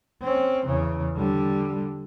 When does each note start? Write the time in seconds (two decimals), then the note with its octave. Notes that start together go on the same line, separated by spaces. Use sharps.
0.22 C4 C#4
0.67 E2 C#3
1.16 D3 G3